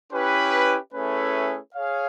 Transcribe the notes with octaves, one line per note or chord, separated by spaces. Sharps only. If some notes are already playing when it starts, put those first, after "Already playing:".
C#4 E4 G4 B4
A3 C#4 E4 G#4 B4
G#4 C#5 F5